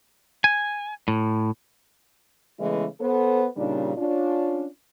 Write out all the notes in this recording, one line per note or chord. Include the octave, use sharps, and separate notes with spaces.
G#5
A2
C#3 E3 G#3 A3 B3 E4
B3 A4 C5
A#2 C#3 G3 D4 D#4
C#4 D4 F4